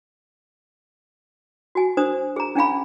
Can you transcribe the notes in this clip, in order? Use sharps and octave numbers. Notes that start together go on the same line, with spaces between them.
F#4 G#5
D4 C5 D#6
G#4 A#5
C#4 D4 G#4 F5 B5